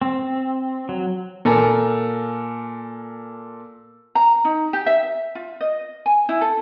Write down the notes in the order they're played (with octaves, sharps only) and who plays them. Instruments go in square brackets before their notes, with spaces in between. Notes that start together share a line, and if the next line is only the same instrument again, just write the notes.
[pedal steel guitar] C4
F#3
[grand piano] A#2 A4 A#4 G#5 A#5
[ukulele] A#5
D#4
G4
E5
F4
D#5
G#5
E4
A4